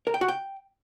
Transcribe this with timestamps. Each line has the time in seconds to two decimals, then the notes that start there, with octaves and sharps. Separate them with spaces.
0.07 A#4
0.14 G5
0.21 F#4
0.28 G5